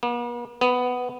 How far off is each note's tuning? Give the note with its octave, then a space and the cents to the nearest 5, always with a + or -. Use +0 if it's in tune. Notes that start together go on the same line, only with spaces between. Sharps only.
B3 -45
B3 +10